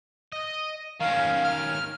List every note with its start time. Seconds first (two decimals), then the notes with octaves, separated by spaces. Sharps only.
0.32 D#5
1.00 D#3 C#4 F5
1.44 F6